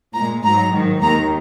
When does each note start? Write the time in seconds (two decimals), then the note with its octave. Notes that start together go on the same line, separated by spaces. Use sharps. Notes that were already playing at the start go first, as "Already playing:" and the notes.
0.14 A#2 G#3 A#5
0.44 G#2 F#3 A#5
0.73 G#2 D#3 F#3
1.02 D#2 D#3 G#3 A#5